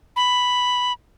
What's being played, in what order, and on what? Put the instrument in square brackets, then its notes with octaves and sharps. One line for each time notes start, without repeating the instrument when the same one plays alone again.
[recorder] B5